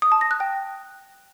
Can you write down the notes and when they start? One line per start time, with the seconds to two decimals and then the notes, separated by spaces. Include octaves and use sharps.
0.02 D#6
0.12 A5
0.21 A#6
0.31 F#6
0.40 G5